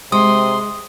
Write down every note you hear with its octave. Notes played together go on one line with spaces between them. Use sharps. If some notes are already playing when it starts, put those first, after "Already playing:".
C3 G#3 C6 D#6